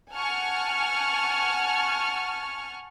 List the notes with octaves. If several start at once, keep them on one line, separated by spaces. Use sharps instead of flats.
F#5 G#5 A5 C#6 F6